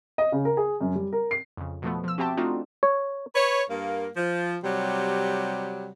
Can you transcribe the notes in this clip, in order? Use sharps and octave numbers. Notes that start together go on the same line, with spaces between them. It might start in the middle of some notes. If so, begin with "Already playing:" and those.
D#5
C#3
A#4
G#4
F#2
G3
A#4
C7
F2 C#3
B2 F3 A3 B3
F3 E6
C4 F#4 G4 E5 G5 A5
A3 C4 D4 D#4 F4 F#4
C#5
B4 C#5
G2 A#3
F3
C3 F#3 G3